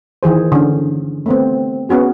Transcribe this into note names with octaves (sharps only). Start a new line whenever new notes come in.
D#3 E3 G#4 C5
D3 C#4
A3 B3 C4
B3 C#4 F#4 G#4